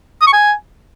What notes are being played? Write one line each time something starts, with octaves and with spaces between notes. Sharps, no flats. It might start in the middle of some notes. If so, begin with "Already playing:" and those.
D#6
C#6
G#5